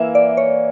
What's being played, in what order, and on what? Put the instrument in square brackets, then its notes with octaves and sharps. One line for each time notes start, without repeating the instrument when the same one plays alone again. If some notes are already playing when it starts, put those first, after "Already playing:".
Already playing: [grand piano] E3 A#3 [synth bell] E5 F5
[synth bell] D5
C#5